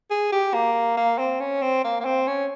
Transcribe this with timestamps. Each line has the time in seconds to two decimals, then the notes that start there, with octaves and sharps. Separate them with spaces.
0.11 G#4
0.32 G4
0.54 A#3
0.97 A#3
1.18 C4
1.40 C#4
1.62 C4
1.84 A#3
2.00 A#3
2.05 C4
2.27 C#4